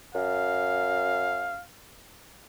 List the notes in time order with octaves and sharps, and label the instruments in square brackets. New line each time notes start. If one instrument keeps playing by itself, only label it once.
[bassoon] F#2 [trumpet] F5